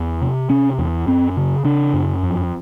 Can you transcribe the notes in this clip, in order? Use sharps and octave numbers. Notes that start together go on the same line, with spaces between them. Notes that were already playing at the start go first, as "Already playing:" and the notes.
Already playing: E2
C3
C3 C#4
E2
F#2 C4
C#3
C#3 D4
F#2
F2